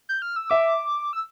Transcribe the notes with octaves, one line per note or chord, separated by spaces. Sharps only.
G6
F6
E6
E5 D6
E6